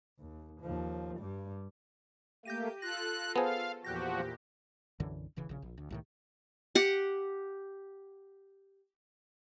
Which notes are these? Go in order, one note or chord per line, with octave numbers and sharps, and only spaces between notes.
D#2
D#2 F3
G2 G3
A3 A#3 G4 G6 A#6 D#7
F4 A4 F#6 A#6
B3 G#4 C5 F5 A5
E2 A#2 F3 F#4 G4 F#6 G6 A#6
B1 F#2 D3 E3
D#1 C#3 E3
A#1 C#3
A#1
D2
C2 A2 D#3
G4 F#5